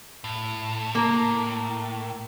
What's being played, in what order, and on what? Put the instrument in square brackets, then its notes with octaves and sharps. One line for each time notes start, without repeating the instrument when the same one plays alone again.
[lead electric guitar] A2
[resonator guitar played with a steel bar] A#3 A#4